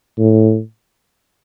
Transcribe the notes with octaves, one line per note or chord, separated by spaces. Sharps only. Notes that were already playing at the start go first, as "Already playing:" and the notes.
A2